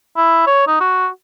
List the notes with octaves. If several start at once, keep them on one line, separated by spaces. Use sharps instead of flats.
E4
C#5
D#4
F#4